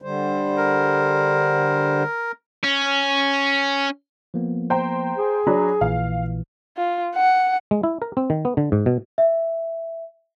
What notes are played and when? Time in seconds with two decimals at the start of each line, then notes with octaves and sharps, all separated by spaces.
0.02 D3 G3 C5
0.57 A#4
2.64 C#4
4.34 F3 A#3 B3
4.70 C5 G5 A#5
5.17 G#4
5.47 F#3 D4 B5
5.81 A#1 A#2 E3 F5
6.77 F4
7.16 F#5
7.71 G#3
7.83 E4
8.02 A#4
8.17 C4
8.30 D#3
8.45 B3
8.57 D3
8.72 G#2
8.86 B2
9.18 E5